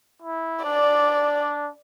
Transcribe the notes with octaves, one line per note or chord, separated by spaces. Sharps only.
E4
D4 D5